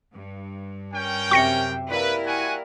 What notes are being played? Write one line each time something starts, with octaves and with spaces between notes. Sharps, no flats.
G2
C#4 A#4 G5
F#2 C3 G4 E5 C#6 A#6 C#7
A#3 E4 A#4 B4 D5
F#4 F#5 G#5